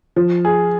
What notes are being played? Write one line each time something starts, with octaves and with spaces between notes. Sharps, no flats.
F3
G#4